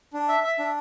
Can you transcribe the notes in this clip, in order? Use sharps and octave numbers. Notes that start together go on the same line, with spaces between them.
D4
E5
E5
D4